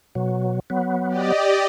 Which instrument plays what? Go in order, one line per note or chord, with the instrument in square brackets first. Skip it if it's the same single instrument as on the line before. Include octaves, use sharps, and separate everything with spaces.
[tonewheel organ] B2 F#3
F#3 B3
[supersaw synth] G4 D5 D#5